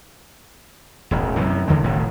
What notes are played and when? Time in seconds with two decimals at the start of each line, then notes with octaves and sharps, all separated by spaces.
1.11 E1 A1
1.37 F#2 C3 E3
1.68 E2 D3 D#3 G#3
1.83 E1 A2 D#3